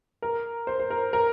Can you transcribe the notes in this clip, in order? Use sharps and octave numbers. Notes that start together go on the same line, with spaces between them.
A#4
C5
C5
A#4
A#4